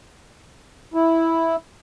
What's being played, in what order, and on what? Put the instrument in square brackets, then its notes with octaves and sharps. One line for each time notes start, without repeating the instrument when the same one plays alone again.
[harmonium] E4